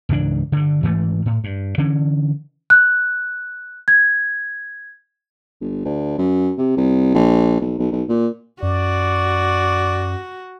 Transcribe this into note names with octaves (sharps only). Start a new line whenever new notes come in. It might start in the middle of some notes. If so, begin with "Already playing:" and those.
C#2 G#2 E3 D4
G2 D3
G#2 E3 A3
A2
G2
D3 E3 C#4
F#6
G#6
G1
D2
F#2
C3
C2
A#1
B1
B1
B1
A#2
F#2 F#4 D5